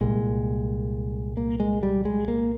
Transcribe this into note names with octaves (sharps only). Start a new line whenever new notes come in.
C2 A#2 G#3
A#3
G#3
G3
G#3
A#3